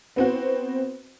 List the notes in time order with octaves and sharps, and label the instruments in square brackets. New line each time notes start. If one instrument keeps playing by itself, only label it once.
[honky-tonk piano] B3 C4 F#4